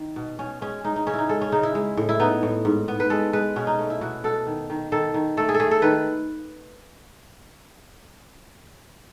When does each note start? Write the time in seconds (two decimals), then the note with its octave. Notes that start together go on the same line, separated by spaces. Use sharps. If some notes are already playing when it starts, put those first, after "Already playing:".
Already playing: D#3
0.16 B2
0.39 B2 C#4
0.61 G#3 C#4
0.84 G#3 D#4
0.96 D#4
1.07 C#3 C#4
1.14 E4
1.19 D#4
1.29 G#3 A4
1.41 C#4
1.52 C#3 D#4
1.63 E4
1.75 G#3
1.97 A2
2.09 E4
2.20 B3 D#4
2.43 A2
2.65 G#2
2.88 B3
3.00 B4
3.10 G#3 A4
3.33 G#3 B4
3.56 B2 C#4
3.67 D#4
3.79 A3
3.90 E4
4.01 B2 F#4
4.24 B2 A4
4.47 D#3
4.70 D#3
4.92 D#3 A4
5.14 D#3
5.37 A3 A4
5.49 G#4
5.54 A4
5.60 A3 G#4
5.71 A4
5.82 D#3 B4